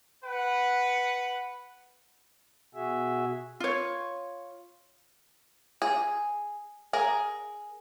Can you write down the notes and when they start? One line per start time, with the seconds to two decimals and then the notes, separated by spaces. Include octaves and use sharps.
0.24 B4 F#5
2.75 B2 F#4 G#4 E5
3.60 F4 C#5
5.82 G#4
6.93 G#4 A#4